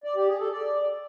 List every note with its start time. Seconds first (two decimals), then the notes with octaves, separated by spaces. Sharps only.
0.04 D5
0.16 G4
0.28 G#4
0.40 A4
0.51 D5